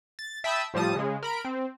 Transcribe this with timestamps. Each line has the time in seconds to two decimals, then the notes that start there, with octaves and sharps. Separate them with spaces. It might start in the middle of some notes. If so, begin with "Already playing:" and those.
0.19 A6
0.44 E5 G5 A5 B5 D#6 E6
0.74 A2 F3 G3 A5 D#6
0.95 C#3 G#3
1.23 A#4 B5 D7
1.45 C4